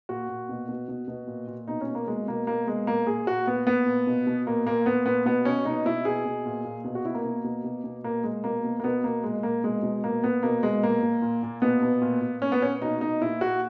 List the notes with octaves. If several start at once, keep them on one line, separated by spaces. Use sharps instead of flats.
A#2 F#4
A#2
B2
B2
B2
B2
A#2
A#2
B2 D#4
C#4
B2
A#3
B2 G#3
B2 A#3
B2 A#3
B2 G#3
A#2 A#3
A#2 G#4
A#2 F#4
A#2 B3
A#2 B3
A#2
B2
B2
A#2 A#3
A#2 A#3
A#2 B3
A#2 B3
B2 B3
B2 C#4
B2 D#4
B2 E4
B2 G#4
B2
A#2
A#2
B2
F#4
B2 E4
A#3
B2
B2
B2
B2
A#2 A#3
A#2 G#3
B2 A#3
B2
A#3
B2 B3
B2 A#3
A#2 G#3
A#2 A#3
B2 G#3
B2
A#2 A#3
A#2 B3
B2 A#3
B2 G#3
A#2 A#3
A#2
A#2
A#2
B2 B3
B2
A#2
A#2
A#2 C#4
B3
A#2 C#4
B2 D#4
B2 D#4
A#2 E4
A#2 F#4